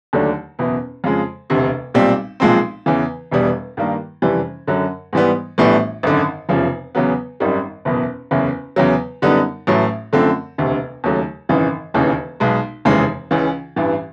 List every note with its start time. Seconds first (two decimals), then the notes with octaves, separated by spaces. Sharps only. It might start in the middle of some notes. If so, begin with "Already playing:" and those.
0.13 D#2 D3 F#3 A3 D4
0.59 F#1 E2 B2
1.04 F2 C#3 F3 G#3
1.50 E1 D2 C3
1.94 B1 A#2 G3 C4
2.40 B1 A#2 F3 G#3 C4
2.86 E2 C#3 E3
3.31 E1 E2 B2 G3
3.77 G2 D#3 G3 A#3
4.22 F#1 F2 C3 E3 G3
4.67 F#2 D3 F#3
5.13 G#2 E3 G3 B3
5.58 A#1 A2 E3 G3 B3
6.03 G#1 F#2 D3
6.49 F1 E2 C#3 F3
6.95 E2 C#3 F#3 B3
7.40 G#1 F#2 D#3 G3
7.85 F#1 E2 B2
8.31 F#1 E2 C#3
8.76 E2 C#3 F#3
9.22 F#2 D3 G3 B3 D#4
9.67 A1 A2 F#3
10.13 F#2 D3 F3 A3 C4
10.58 E1 D2 C3
11.04 D#2 C#3 F#3 A3
11.49 G#1 F#2 C#3 E3
11.94 E1 D#2 C#3 E3
12.40 B1 B2 G#3
12.85 F1 D#2 C#3 E3 G#3
13.31 C#2 C#3 E3
13.76 A1 G2 E3